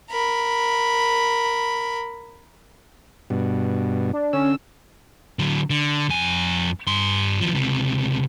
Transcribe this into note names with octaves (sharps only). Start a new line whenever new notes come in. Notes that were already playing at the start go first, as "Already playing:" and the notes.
A#4 B5
G2 B2
D4
D3 C#4 E6
D3 F#3
D3
F2 G#5
G2 C6
D#2 F3
C#2 C3